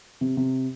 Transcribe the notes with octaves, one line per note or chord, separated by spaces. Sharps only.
C3
C3